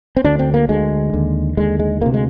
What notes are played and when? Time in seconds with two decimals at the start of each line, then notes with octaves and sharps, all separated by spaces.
0.17 C4
0.24 D2 D3 D4
0.39 C4
0.54 A#3
0.69 D2 D3 G#3
1.13 D#2 D3
1.57 D#2 D3 G#3
1.79 G#3
2.01 D2 C3 A#3
2.14 G#3